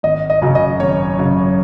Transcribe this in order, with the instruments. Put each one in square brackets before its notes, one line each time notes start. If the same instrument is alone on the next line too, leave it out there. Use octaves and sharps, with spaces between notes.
[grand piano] G#1 D#5
D#5
F#2 C#3 F#3
D#5
G#1 C#5
F#2 C#3 F#3